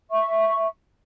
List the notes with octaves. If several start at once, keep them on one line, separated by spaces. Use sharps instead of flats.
E5 C#6